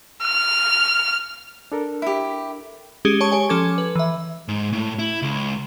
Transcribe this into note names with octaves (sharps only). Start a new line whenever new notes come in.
F6
D4 A4 A#4
E4 G4
G#3 C#4 G4 G#4
C#5 A5 C#6
G4 C#5 G#5
F3 C#4 A4 D6 G#6
B4
E3 E5
G#2
A2
E4
C#2